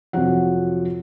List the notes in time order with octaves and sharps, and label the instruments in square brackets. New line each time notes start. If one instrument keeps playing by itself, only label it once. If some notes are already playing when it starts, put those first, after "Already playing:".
[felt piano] F2 C3 F3 F#3 F#5